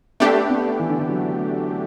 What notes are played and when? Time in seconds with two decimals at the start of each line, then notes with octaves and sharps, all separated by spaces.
0.20 A3 B3 D4 G4
0.49 B3
0.79 E3
0.90 D3
0.99 E3
1.09 F#3